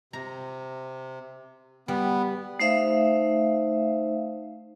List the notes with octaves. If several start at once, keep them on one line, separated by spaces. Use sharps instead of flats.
C3 A#5
G3 B3
A3 D#4 C5 E5 F5